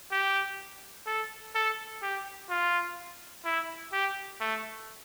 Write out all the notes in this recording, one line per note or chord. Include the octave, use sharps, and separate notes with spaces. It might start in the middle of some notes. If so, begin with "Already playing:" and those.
G4
A4
A4
G4
F4
E4
G4
A3